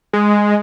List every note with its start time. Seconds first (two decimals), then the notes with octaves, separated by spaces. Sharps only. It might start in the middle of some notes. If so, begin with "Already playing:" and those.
0.13 G#3